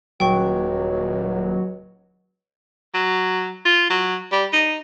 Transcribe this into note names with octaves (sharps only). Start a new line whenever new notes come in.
D#1 C#2 F#3 G5 C#6
F#3
F4
F#3
G3
D#4